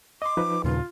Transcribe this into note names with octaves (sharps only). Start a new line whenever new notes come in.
D#5 C6 D6
F3 D#4 B4
D#2 A#2 C#3 F4